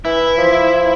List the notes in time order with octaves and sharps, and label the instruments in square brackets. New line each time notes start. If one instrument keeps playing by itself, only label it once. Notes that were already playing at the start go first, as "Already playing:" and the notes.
[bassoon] E3 [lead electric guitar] E4
[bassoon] F3